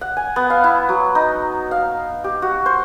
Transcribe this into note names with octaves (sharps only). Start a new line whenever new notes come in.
F#5
G#5
B3
F5
E4
F#3
D#4
F5
G4
F#4
C5